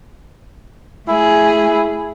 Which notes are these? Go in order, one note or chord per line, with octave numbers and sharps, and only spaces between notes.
A3 E4 G#4